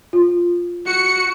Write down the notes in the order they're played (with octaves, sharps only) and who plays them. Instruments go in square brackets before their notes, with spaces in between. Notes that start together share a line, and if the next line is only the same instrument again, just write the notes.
[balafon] F4
[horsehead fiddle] F#4 [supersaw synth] C#7